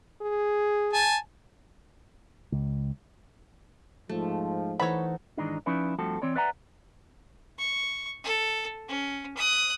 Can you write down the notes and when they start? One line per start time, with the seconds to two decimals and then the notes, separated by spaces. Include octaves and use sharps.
0.21 G#4
0.93 G#5 A5
2.52 C#2
4.09 G#2 F3 A3
4.80 E3 D#4 A4 C5 C#5 F#5 B5
5.37 G#2 D#3 E3 G#3 D4 D#4
5.66 F3 C#4 D#4 E4 B4 D5
5.99 G2 F3 A3 C4 F#4 A4
6.22 E3 C4 C#5 D5
6.36 B4 D5 E5 F#5 G#5 A#5
7.58 C#6
8.24 A4
8.89 C#4
9.37 D#6 F#6